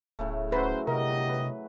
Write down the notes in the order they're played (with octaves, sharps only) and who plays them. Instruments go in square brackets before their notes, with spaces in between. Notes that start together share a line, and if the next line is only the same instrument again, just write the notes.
[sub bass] D1 [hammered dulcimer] A2 C#3 A3
[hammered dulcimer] F#3 F#4 [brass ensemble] C#4 C5 [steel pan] B4
[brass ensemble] G1 G4 D#5 [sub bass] C3 [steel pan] A#4
[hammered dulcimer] B4